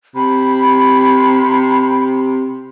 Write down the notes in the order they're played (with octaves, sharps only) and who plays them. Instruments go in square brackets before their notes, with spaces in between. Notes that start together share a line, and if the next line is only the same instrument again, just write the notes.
[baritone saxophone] C3 [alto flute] B5